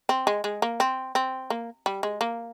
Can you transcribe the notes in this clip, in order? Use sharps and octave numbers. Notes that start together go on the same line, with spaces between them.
C4
G#3
G#3
A#3
C4
C4
A#3
G3
G#3
A#3